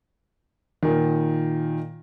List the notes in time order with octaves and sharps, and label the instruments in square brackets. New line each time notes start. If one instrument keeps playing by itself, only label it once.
[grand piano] A#2 D#3